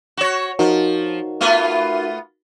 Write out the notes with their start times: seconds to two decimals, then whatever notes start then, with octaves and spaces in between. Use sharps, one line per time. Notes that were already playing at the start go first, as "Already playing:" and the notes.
0.17 F#4 C#5
0.59 F3 D#4 F#4 A#4
1.41 A3 B3 F4